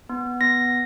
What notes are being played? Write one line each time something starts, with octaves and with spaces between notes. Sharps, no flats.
B3
B3 A#6